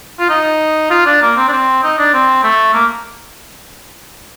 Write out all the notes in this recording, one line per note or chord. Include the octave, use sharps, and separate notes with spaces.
F4
D#4
F4
D4
A#3
C4
D4
C4
D#4
D4
C4
A3
A#3